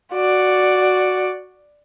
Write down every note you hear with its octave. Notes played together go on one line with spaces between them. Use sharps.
F#4 D5